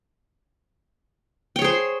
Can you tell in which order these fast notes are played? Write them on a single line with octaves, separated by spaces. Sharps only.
G5 C#5 G#4 C5